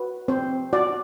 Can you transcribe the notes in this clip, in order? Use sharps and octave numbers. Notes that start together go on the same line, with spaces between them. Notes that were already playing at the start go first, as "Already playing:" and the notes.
Already playing: F#4 B4
C4 C5
F#4 D5